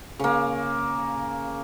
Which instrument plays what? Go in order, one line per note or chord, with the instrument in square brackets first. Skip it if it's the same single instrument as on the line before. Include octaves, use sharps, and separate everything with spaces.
[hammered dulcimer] C#3 A#3